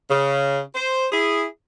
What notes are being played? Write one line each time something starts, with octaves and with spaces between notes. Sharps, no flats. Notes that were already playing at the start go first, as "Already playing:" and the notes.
C#3
C5
E4 G#4